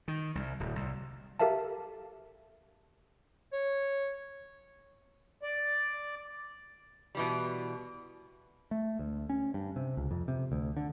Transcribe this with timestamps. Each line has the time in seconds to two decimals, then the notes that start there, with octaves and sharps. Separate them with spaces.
0.08 D#3
0.35 C2
0.60 D1
0.76 C2
1.39 G4 A4 A#4 E5 F5 A5
3.53 C#5
5.42 D5
7.15 B2 E3 G3
8.71 A3
8.99 D2
9.30 C#4
9.54 G2
9.76 C3
9.97 C#2
10.11 F2
10.28 C3
10.52 D2
10.77 D3